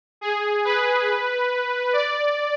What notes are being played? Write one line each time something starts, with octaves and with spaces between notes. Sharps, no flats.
G#4
B4
D5